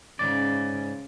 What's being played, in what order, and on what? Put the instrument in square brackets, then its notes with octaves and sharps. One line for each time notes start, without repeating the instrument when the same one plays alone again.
[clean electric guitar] G#2 D5 [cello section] C#3